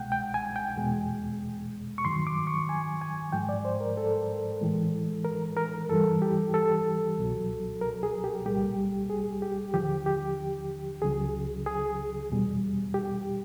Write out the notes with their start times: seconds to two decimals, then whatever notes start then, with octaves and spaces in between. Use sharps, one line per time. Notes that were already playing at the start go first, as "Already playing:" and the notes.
Already playing: C2 B2 G#3 F#5 G5
0.12 G5
0.34 G#5
0.56 G5
0.76 E2 B2 G#3
1.98 C#6
2.05 G2 D#3 F#3 C6
2.27 D6
2.47 C#6
2.69 G#5
3.01 G#5
3.33 G#2 F3 G#3 G5
3.49 D5
3.65 C5
3.80 A#4
3.97 A4
4.61 A2 E3 G#3
5.25 A#4
5.57 A#4
5.89 G2 E3 G3 A4
6.22 G4
6.54 A4
7.17 C2 B2 F#3
7.81 A#4
8.03 G#4
8.24 G4
8.46 C2 A#2 G3 G4
9.10 G#4
9.42 G4
9.73 D#2 D3 F3 G4
10.06 G4
11.01 C#2 C#3 F#3 G#4
11.66 G#4
12.30 E2 B2 G3
12.94 G4